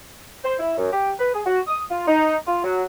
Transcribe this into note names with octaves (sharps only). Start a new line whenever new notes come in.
C5
E4
F#2
G4
B4
G#4
F#4
D#6
F4
D#4
F4
F#3